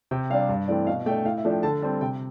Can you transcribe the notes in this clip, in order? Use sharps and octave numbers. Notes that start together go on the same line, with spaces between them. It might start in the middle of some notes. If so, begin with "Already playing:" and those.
C3 G5
G3 D4 F5
G2 F5
E3 A3 C4 D5
B2 F5
A3 D4 G5
A2 F5
E5
F3 A3 D4
G5
D3 A5
G3 C4 A5
C3 G5